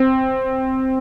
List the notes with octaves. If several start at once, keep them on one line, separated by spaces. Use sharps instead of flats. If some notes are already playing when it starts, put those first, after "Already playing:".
Already playing: C4